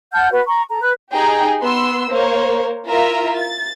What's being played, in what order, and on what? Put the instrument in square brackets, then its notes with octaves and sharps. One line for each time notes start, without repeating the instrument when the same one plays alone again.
[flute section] F#5 A5 F6 G6
F#4 B4
A#5 C#6
A4 A#5
B4 F#6
[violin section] D#4 G4 G#4 G5 A#5
B3 C6 E6
A#3 A#4 C5 C#5
E4 F4 A#4 E5 A#5
A6